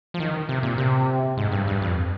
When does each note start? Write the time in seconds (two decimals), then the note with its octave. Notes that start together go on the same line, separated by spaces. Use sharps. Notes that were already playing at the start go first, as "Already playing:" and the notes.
0.14 F3
0.20 D#3
0.49 C3
0.63 A#2
0.78 C3
1.37 G#2
1.52 G2
1.67 G2
1.82 F2